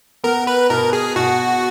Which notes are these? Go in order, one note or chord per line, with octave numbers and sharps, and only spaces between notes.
B3 A#4
B4
B2 A#4
G#4
B2 F#4